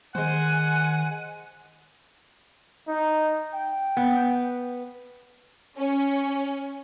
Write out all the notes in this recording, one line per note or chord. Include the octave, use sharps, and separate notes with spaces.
D#3 G#3 C5 F#5 G#5
D#4
G5
B3
C#4